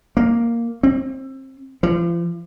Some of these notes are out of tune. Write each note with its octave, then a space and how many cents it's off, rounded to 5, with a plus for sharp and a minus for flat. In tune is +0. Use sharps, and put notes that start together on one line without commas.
A#3 +0
C4 +30
F3 -40